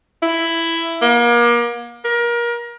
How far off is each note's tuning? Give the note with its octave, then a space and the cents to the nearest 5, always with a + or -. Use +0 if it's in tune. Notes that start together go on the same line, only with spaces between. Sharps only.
E4 +10
A#3 +35
A#4 +30